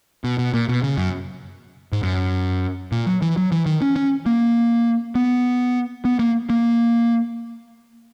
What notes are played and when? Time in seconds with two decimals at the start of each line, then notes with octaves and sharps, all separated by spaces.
0.24 B2
0.38 B2
0.54 A#2
0.69 B2
0.83 C#3
0.98 F#2
1.92 G#2
2.03 F#2
2.92 A#2
3.06 F#3
3.22 E3
3.37 F#3
3.52 E3
3.66 D#3
3.82 C#4
3.96 C#4
4.26 A#3
5.15 B3
6.05 B3
6.19 A#3
6.50 A#3